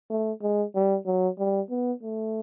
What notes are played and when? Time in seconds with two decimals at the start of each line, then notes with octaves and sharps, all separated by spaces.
0.10 A3
0.42 G#3
0.75 G3
1.06 F#3
1.39 G3
1.70 B3
2.03 A3